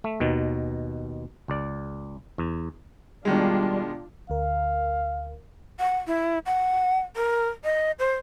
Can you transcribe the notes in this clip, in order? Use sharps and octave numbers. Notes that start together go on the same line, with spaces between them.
A3
D#2 B2 D#3
C#2 D5
E2
B2 D#3 G3 G#3 D4 F4
D2 A#4 F5
F#5
E4
F#5
A#4
D#5
C5